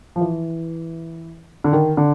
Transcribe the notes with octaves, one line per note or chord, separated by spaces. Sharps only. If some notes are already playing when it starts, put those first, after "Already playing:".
F3
E3
D3
D#3
D3